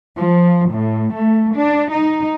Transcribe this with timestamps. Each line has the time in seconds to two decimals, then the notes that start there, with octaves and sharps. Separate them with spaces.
0.17 F3
0.72 A2
1.14 A3
1.55 D4
1.90 D#4